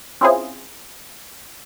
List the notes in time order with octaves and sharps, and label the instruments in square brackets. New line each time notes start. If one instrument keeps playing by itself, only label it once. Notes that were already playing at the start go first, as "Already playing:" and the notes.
[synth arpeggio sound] C4 C#4 E4 F4 G#4 C5